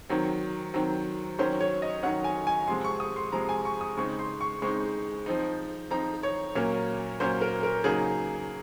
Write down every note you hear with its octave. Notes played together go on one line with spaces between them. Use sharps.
D#3 F#3 C4
D#3 F#3 C4
D#3 F#3 C#4 C5
C#5
D#5
D#3 F#3 C#4 F#5
G#5
G#5
C3 F3 G#3 C6
C#6
D#6
C6
C3 F3 G#3 A#5
G#5
C#6
D#6
C#3 G#3 C4 D#4 C#6
C6
C#6
C#3 G#3 C4 D#4 C#6
F3 C4 D#4
F3 C4 D#4 A#5
C#5
A#2 F#3 A#3 C#4
A#2 F#3 A#3 C#4 C5
A#4
A#4
C#3 F#3 A#3 D#4 G#4